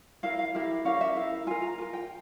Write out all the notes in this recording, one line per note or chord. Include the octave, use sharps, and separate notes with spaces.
E4 A#4 F5
F5
E4 G4 A#4
C#4 G4 A#4 F5
E5
E4 A#4 F5
F4 A#4 G#5
A#5
F4 A#4 G#5
G5